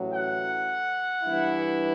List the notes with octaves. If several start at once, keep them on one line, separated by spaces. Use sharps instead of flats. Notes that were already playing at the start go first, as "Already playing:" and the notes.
Already playing: A1 A2 F#3
F#5
G2 E3 B3 E4